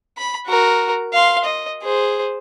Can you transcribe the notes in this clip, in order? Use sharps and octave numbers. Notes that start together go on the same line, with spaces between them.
B5
F#4 A#4
F5 C6
D#5
G#4 C5